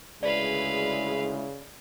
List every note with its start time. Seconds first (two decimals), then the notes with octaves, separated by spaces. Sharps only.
0.23 D2 C#3 G#3 E4 B4 D5 F5